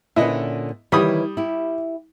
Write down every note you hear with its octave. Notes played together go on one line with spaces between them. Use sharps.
A#2 D3 C#4 E4 B4 D#5
D#3 E3 G3 C#5 B5 D#6
E4 G4